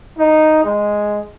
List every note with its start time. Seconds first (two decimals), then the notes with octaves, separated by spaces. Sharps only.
0.18 D#4
0.64 G#3